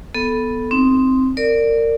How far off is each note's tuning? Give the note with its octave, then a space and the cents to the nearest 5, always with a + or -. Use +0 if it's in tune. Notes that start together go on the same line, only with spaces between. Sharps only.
B3 -5 A4 +0
C4 +0 D#4 +0
A#4 -25 D5 +0